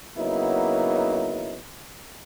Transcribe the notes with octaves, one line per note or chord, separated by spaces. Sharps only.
C#3 F#3 A#3 B3 D#4 E4